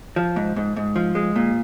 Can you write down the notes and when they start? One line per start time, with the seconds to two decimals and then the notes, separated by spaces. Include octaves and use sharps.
0.16 F3
0.36 G#2
0.56 G#2
0.76 G#2
0.96 F3
1.15 G#3
1.36 A#2